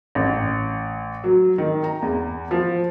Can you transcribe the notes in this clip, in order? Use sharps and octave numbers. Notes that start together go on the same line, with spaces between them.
A1
F#3
D#3
A#5
E2
F3